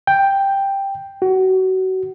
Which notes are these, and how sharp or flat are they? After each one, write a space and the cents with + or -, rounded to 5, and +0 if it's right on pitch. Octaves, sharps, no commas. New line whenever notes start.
G5 +5
F#4 +25